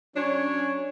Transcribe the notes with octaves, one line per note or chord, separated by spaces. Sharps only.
F#3 C#4 D4 C#5